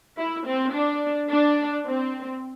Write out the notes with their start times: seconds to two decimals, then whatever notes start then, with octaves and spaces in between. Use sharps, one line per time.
0.18 E4
0.46 C4
0.74 D4
1.30 D4
1.86 C4